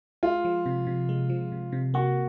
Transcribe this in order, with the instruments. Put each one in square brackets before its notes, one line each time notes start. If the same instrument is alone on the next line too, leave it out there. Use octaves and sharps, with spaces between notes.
[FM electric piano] G#3 [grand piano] F4
[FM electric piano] F3
C3
C3
G#3
F3
C3
C3
[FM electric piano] A#3 [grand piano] F#4